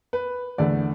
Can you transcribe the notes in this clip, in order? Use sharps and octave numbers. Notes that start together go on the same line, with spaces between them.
B4
E2 D3 A3 D5